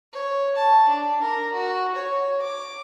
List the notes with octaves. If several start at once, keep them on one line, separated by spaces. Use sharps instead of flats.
C#5
A5
D4
A#4
F#4
C#5
D6